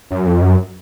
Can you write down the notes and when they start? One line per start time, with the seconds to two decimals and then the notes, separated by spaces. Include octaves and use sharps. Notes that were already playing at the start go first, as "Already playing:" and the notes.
0.11 F#2
0.27 F2
0.42 F#2